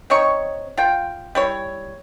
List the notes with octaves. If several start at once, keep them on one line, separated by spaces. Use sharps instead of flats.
C4 D#4 C#5 C#6
F4 G5
G3 E4 C#5